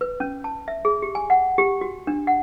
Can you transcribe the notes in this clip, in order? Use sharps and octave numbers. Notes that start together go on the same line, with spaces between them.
B4
C#4
A5
E5
G#4
G4
G#5
F#5
G4
F#4
D4
F#5